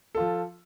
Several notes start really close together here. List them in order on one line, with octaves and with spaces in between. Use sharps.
A4 F4 F3